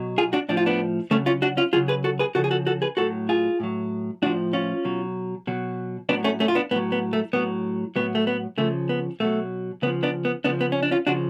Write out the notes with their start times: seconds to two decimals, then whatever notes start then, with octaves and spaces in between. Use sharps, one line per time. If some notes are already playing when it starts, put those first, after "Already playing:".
Already playing: B2 F#3
0.18 F4 G#4
0.33 D4 F#4
0.49 A2 F3 D4
0.57 F4
0.66 B3 D4
1.11 C#3 F#3 A3 C#4
1.26 C#4 F4
1.42 D4 F#4
1.57 C#4 F4
1.73 C#3 F#3 F4 G#4
1.88 G#4 B4
2.04 F#4 A4
2.19 G#4 B4
2.35 C#3 F3 F#4 A4
2.44 G#4
2.51 F#4 A4
2.67 F#4 A4
2.82 G#4 B4
2.97 A2 F#3 F#4 A4
3.29 F4 G#4
3.60 A2 F#3
4.22 A2 F3 D4 F#4
4.53 C#4 F4
4.85 B2 F#3
5.47 B2 F#3
6.09 A2 F#3 B3 D4
6.24 A3 C#4
6.40 A3 C#4
6.48 F4
6.55 B3 D4
6.71 A2 F#3 B3
6.92 B3
7.13 A3
7.33 A2 F#3 B3
7.96 A2 F#3 B3
8.15 A3
8.27 B3
8.58 C#3 F3 A3
8.89 B3
9.20 B2 F#3 A3
9.82 C#3 B3
9.87 F3
10.03 B3 D4
10.25 B3
10.44 C#3 B3 D4
10.49 F3
10.61 B3
10.72 C#4
10.83 D4
10.91 C#4 F4
11.07 C#3 F3 D4 F#4